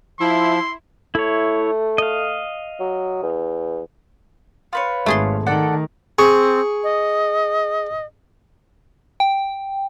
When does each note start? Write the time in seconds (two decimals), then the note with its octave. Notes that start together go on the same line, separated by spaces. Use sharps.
0.20 F3 E4 C6
1.15 A3 E4 C#5
1.98 D#5 F5
2.80 F#3
3.23 E2
4.73 F4 B4 C#5
5.06 G#1 A3 G#4 C6
5.46 D#3 A4 D5 F#5
6.19 C4 G#4 C#6
6.84 D#5
9.20 G5